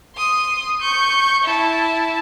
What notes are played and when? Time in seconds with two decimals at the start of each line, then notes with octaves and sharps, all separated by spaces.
0.16 C6 D#6
0.79 C#6 G6
1.44 E4 A5